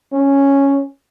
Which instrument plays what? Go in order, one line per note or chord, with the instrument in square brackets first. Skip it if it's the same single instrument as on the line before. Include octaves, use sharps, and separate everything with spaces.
[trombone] C#4